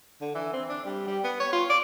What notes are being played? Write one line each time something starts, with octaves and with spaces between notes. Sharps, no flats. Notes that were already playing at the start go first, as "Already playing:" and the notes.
D3
E3
C4
D4
G3
G3
B3
C#5
F4
D5